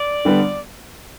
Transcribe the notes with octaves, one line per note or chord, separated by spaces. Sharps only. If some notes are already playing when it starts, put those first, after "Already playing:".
Already playing: D5
D3 G3 B3